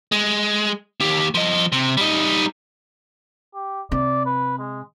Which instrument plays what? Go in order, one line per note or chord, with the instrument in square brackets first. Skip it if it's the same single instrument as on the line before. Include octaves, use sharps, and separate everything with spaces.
[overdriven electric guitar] G#3
D#2 G4
F3 D#5
C3
G3 D#4
[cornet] G4
[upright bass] C3 [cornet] D5
[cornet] B4
G#3